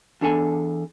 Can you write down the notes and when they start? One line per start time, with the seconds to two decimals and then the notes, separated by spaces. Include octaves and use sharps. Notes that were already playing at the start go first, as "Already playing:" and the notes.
0.21 E2 D4 A4 G#5